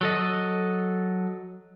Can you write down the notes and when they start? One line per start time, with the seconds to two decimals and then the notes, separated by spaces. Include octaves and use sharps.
0.01 F#3 A4 D#5